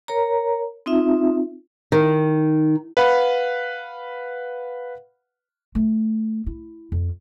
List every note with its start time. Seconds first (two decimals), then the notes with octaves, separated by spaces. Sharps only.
0.08 A#4 C#5 A#5
0.86 C4 D#4 F4 E5
1.92 D#3
2.97 B4 F5 F#5 B5
5.75 A3
6.46 E4
6.92 F2